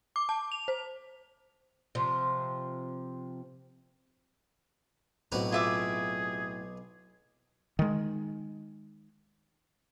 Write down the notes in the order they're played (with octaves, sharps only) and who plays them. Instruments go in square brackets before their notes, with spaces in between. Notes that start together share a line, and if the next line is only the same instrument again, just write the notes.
[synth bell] D6
A5
F7
C5
[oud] C3 F3
[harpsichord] B1 B4 A#5 [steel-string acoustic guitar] A2 C4 F#4
[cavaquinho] F4 E5 D6 [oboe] G#4
[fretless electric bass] D#3 G#3